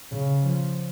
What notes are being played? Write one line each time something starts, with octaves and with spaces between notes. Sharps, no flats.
C#3
F3